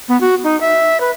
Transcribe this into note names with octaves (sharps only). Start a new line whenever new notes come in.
B3
F#4
D#4
E5
B4